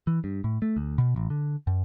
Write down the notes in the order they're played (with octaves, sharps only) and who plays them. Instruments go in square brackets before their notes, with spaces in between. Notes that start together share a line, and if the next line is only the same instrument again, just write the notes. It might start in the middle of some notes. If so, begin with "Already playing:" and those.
[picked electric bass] E3
G2
A2
A3
D2
B2
A1
D3
F#2